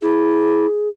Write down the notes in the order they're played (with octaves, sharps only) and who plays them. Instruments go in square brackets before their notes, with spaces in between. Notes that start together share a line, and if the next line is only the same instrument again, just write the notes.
[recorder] E4 [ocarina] G#4